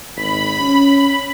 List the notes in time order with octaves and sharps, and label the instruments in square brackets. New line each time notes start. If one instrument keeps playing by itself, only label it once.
[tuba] G#1 [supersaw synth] B5
[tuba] C#4